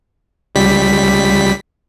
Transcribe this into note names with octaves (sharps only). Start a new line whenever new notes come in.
C#2 G3 B6